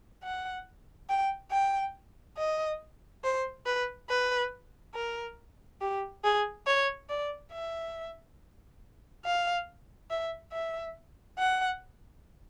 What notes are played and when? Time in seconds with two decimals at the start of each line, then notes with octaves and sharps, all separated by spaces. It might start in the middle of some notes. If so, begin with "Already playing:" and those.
0.24 F#5
1.09 G5
1.51 G5
2.37 D#5
3.24 C5
3.66 B4
4.10 B4
4.95 A#4
5.81 G4
6.24 G#4
6.67 C#5
7.09 D5
7.52 E5
9.25 F5
10.10 E5
10.53 E5
11.39 F#5